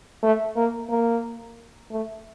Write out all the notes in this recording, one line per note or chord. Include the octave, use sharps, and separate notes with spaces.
A3
A#3
A#3
A3